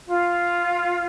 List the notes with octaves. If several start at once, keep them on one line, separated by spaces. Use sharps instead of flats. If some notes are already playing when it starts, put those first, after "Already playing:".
F4